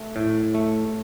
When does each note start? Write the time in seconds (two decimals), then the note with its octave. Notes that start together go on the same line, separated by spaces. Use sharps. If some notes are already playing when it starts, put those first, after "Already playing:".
Already playing: A3
0.16 A2
0.54 A3